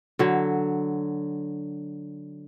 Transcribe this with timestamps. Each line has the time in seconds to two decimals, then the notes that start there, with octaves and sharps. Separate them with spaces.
0.19 D3 F#3